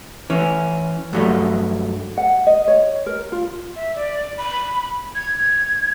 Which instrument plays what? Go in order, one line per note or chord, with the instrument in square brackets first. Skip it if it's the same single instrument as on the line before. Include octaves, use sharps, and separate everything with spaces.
[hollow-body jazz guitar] E3 C#4
G2 F#3 A3
[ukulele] F#5
D#5
C#5
A#4
F4
[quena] E5
D5
B5
G#6